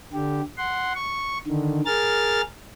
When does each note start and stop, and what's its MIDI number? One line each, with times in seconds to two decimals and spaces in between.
0.13 0.41 50
0.13 0.41 67
0.57 0.93 78
0.57 0.93 84
0.95 1.38 85
1.47 1.81 50
1.47 1.81 51
1.86 2.41 68
1.86 2.41 70
1.86 2.41 89
1.86 2.41 93